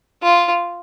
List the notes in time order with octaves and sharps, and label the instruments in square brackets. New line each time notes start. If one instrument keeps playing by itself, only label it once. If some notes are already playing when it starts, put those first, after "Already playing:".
[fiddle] F4